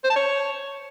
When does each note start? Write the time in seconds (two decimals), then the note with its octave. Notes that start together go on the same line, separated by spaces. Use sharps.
0.04 C5
0.10 A5
0.16 C#5